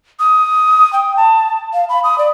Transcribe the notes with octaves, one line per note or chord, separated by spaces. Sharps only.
D#6
G5
A5
F5
B5
D#6
D5